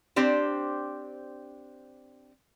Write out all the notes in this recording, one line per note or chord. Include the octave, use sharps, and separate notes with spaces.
C4 D4 G4 C5